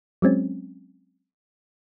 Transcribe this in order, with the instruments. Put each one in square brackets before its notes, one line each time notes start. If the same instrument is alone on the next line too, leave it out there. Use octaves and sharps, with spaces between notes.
[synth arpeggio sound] F#3 G#3 C4 C#4